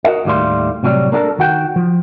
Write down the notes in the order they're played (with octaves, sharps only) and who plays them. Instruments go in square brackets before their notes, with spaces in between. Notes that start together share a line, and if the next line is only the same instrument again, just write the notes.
[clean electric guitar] F#4 A#4 D#5
D#2 A2 G3 F5 C6
A2 C3 F#3 G3
A#3 D4 F#4 A4 A#4
D#3 F#4 G5
F3